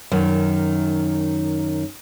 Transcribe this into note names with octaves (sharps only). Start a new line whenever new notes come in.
F#2 D#3